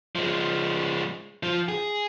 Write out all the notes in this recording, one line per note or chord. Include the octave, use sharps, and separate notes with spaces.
F3 G#3
F3
G#4